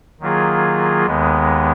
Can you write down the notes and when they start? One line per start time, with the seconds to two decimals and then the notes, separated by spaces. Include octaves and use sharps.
0.20 D#3 F#3 A#3 F4 G#4
1.06 D#2 D#3 G#3 B3